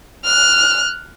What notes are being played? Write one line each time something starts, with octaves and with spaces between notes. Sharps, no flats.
F6 F#6